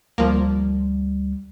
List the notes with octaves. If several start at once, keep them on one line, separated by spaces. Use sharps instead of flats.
D2 F3 G3 A#3